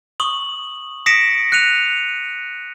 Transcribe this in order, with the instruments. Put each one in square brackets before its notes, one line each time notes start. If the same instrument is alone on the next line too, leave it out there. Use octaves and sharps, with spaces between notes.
[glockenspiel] C#6 D#6 F#7
D#6 A#6 B6 C#7 D7 E7
F#6 C#7 D#7 F7